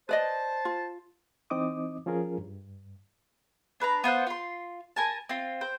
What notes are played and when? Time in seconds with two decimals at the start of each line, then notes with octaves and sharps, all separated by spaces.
0.09 B4 C5 D5 D#5 A5
0.65 F4
1.50 E3 C4 D#4 D#5 D6 D#6
2.06 F3 C#4 F4 G#4 A#4
2.38 G2
3.80 D4 B4 E5 A#5
4.04 B3 F4 C5 F#5
4.27 F4 C6
4.96 A#4 G#5 A5
5.29 C4 F4
5.61 C5 G5